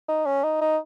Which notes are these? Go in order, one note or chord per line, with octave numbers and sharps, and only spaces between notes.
D#4
C#4
D#4
D#4